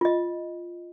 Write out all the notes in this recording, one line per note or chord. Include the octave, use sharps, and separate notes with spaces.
F4 D#5